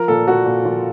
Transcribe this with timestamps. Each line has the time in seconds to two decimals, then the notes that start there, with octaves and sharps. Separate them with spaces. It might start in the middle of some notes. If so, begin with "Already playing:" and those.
Already playing: F3 A#4
0.08 A#2 A4
0.27 A#2 F#4
0.46 A#2
0.65 F3 F4